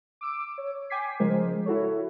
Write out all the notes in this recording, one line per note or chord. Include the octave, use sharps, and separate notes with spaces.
D6 E6 D7
C#5
G5 G#5 D6 G#6 B6 C7
C#3 F3 G#3 A#4 C5
E4 F#4 A4 C#5